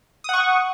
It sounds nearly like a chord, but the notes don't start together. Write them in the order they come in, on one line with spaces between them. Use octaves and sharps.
D#6 F#5 C#6